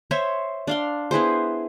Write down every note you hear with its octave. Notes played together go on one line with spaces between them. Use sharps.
C5 C#5 E5
D4 F5 C6
B3 E4 G#4 C5